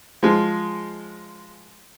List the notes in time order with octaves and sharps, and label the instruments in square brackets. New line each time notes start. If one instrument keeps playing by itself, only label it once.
[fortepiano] F3 G#3